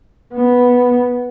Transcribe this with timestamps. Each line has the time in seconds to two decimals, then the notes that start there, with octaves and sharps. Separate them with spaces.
0.35 B3